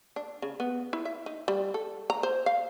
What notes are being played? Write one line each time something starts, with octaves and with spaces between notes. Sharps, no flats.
D4
C#3
B3
E4
E5
D#4
G3
A4
A#5
C5
F5